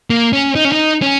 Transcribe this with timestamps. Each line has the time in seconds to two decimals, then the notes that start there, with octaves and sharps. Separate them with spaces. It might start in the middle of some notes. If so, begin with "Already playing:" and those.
0.10 A#3
0.33 C#4
0.56 D#4
0.65 C#4
0.72 D#4
1.02 C#4